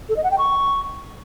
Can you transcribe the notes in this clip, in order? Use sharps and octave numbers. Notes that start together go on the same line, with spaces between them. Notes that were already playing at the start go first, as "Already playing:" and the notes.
A4
D#5
F#5
G5
C#6